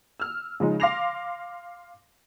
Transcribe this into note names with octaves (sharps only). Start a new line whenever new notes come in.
E6 F6
C#3 F3 G#3 D#4
F5 C6 D6 A#6 C7 F7